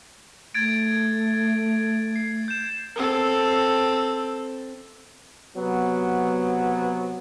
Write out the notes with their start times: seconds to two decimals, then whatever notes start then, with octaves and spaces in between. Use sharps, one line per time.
0.54 A3 G#6 A6 D7
2.16 C7
2.48 G6 E7
2.96 C4 A4
5.56 C3 F#3 B3